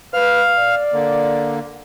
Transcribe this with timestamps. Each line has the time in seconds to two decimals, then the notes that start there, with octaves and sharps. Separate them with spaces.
0.13 B4 F5 F6
0.58 D5
0.93 D3 A#3